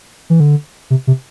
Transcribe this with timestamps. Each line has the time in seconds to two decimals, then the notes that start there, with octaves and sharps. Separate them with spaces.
0.30 E3
0.40 D3
0.90 C3
1.07 C3